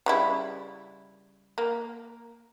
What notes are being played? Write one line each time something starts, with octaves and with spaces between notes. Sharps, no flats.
C#3 G3 E4
A#3